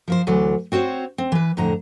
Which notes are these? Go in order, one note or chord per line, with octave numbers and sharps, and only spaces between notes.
F3 A#4 C5
D2 E3 F#3 D5
C4 F#4 C5 C#5
C4
E3 B4
F2 A2 D3 A#5